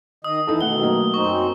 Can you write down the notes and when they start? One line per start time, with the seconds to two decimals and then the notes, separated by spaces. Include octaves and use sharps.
0.24 D#3 D#5 D#6
0.47 E3 D#4 E4 A4
0.61 B2 D#3 A3 A4 F#5 G7
0.81 F#3 A3 A#3
1.14 F#2 C4 D#4 C#6